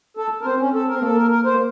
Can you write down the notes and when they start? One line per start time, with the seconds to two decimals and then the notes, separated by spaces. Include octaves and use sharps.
0.17 A4
0.41 A#4
0.45 C4 C5
0.60 C#4
0.74 A4
0.88 A#4
0.95 C4
1.02 A#3 A4
1.15 A#4
1.31 A#4
1.45 C5
1.53 A#3